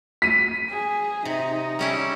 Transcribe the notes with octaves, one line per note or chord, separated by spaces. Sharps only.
B6 D#7
G#4
C3 D#4
G3 C#4 E4